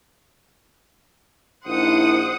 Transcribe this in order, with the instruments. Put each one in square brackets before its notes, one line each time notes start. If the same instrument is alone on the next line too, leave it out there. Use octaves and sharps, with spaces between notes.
[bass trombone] A#1 [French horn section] D#4 E4 [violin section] C5 F#5 D#6